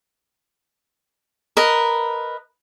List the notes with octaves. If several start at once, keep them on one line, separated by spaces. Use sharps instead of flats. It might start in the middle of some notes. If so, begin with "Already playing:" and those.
A#4 B4 D#5